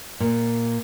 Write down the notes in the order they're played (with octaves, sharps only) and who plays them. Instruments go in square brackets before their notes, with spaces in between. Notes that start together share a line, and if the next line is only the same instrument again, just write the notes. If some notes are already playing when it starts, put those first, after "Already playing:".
[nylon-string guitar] A#2